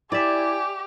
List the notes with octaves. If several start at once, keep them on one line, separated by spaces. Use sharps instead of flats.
E4 G4 D5 E5 G#5